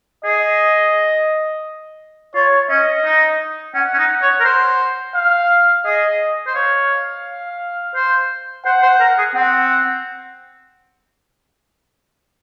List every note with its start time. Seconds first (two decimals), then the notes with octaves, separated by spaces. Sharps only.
0.24 G#4 D#5
2.35 F4 C#5
2.70 C#4 D#5
3.05 D#4
3.75 C#4 F#5
3.94 C#4
3.98 D#4
4.22 C#5
4.40 A#4
4.45 C5
5.15 F5
5.85 G#4 D#5
6.47 C5
6.55 C#5 F5
7.96 C5
8.65 C5 F#5
8.83 C5
9.00 A#4
9.18 G#4
9.35 C4 F#5